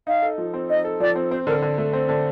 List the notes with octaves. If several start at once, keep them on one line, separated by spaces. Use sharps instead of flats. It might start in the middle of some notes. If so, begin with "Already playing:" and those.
D#4 F5
A4
F3
C4
D#4 D#5
A4
F3 D5
C4
C4 C5
D3 A#4
D3
A3
C4
D3